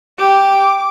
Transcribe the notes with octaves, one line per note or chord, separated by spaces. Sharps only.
G4 D6